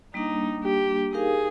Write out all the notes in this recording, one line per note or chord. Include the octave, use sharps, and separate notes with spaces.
G3 A#3 D4 D#4
G4
D#4 G4 G#4 A#4 F5